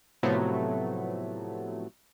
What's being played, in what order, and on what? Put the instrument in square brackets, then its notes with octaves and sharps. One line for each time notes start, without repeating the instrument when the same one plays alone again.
[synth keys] A2 C3 F3 F#3 A3 B3